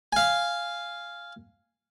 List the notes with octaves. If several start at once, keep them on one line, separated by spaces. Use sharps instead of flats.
F5 G#5